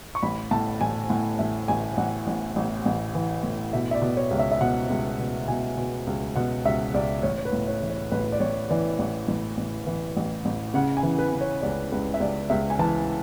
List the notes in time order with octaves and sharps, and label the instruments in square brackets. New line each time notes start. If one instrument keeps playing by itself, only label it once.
[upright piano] C#6
A1 B5
A2 A5
A1 G#5
A2 F#5
A1 E5
A1 G#5
A1 F#5
A1
A1
A1
E3
A2
B2 E5
E5
D5
B2
C#5
C#2
E5
E5
B2 F#5
C#2
B2
B2 G#5
B2
C#2
B2 F#5
C#2 E5
C#2 D5
A1 C#5
C#5
B4
A2
C#5
E3
C#5
A1 B4
D5
A1 C#5
E3 D5
A1
A1
A1
E3
A1
A1
C#3 F#5
G#5
E3
B4
C#3
C#5
C#2 D5
C#2 B4
E5
C#2 D5
C#2 E5
G#5
E3 A5